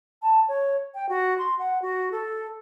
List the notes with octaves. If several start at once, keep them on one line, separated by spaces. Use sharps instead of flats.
A5
C#5
G5
F#4
C6
F#5
F#4
A4